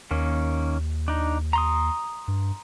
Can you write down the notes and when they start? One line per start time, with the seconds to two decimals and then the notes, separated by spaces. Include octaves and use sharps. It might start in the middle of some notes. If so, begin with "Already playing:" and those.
0.11 D#2 D#3 A#3 C#4
1.08 D4 D#4
1.53 A#5 C6 D#6
2.28 G2